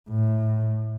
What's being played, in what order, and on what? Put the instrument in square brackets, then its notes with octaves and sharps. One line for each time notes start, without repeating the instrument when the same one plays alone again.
[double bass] A2